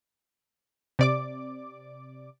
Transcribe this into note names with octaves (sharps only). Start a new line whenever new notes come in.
C3 D5 D6